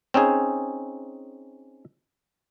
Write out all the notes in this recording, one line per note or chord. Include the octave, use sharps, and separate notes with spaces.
C4 C#4 D#4 G#4